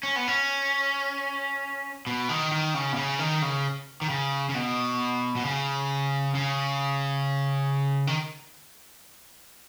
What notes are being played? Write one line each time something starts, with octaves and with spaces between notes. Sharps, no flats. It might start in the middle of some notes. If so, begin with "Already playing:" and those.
C#4
B3
C#4
B2
D#3
D#3
C#3
B2
C#3
D#3
C#3
D#3
C#3
C#3
B2
B2
C#3
C#3
D#3